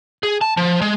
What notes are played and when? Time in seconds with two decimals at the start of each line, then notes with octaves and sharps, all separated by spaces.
0.23 G#4
0.41 A5
0.57 F3
0.82 G#3